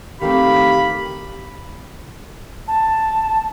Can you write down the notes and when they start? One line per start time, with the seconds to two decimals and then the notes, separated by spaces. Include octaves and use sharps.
0.21 D#3 A3 C4 G4 F5 B5
2.68 A5